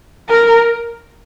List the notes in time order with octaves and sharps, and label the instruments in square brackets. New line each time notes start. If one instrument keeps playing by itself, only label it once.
[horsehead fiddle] A#4